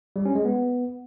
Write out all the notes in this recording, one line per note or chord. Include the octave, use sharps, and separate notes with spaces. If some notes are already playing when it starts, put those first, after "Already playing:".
G3
C#4
G#3
B3